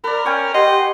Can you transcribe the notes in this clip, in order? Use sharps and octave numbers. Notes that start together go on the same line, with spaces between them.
A#4 B4 D5
C#4 G5 G#5 C#6
G4 D#5 F#5 C6